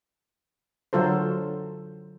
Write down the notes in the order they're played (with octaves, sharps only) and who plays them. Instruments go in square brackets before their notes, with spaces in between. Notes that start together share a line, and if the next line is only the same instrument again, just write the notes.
[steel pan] D3 F#3 F4 A4 C5